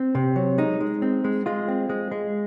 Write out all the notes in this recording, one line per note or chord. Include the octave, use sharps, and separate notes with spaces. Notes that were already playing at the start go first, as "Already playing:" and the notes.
Already playing: C4
C3
F#3
G#3 D#4
G#3
C4
G#3
G#3 F4
C4
G#3
G#3